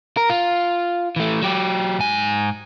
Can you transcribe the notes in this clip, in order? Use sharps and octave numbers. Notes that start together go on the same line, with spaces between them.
A#4
F4
E3 A3
F#3 G4
G#2 G#5